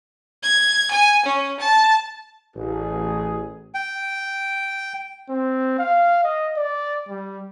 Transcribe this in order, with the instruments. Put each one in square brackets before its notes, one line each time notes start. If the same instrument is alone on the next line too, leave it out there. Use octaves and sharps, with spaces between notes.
[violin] G#6
G#5
C#4
A5
[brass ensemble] A1 [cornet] G#4
[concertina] G5
[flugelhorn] C4
F5
D#5
D5
G3